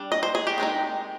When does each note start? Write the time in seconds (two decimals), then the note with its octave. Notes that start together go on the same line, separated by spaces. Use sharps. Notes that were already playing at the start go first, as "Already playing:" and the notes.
Already playing: G3 D4
0.12 D#5
0.23 C5
0.35 G#4
0.47 G4
0.58 D#3 G#3 C4 D#4